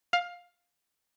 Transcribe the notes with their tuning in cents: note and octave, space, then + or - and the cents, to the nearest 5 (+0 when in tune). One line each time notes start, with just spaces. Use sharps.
F5 +15